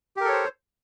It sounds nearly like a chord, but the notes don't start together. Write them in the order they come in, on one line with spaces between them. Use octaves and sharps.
G4 A#4 A4 C#5 C5